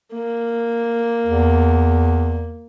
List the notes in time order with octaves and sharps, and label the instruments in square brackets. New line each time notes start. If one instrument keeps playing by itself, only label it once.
[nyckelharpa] A#3
[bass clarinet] E2